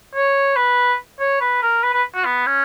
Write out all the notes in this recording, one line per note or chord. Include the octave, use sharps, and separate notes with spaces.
C#5
B4
C#5
B4
A#4
B4
B4
F#4
B3
C#4